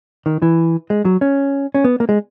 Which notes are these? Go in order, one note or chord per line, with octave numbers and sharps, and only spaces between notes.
D#3
E3
G#3
F#3
C#4
C#4
B3
A#3
G#3